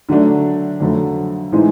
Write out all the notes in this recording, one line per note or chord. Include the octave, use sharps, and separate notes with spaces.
D3 F#3 A3 D4
F2 D3 F#3 A3
A2 E3 G#3 C4 D#4